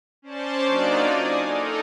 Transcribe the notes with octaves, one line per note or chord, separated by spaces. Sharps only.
C#4 C5 D5 A5
F#3 A#3 D4 D#4 F4 D5
G#5 D#6
D#4 A4 A#4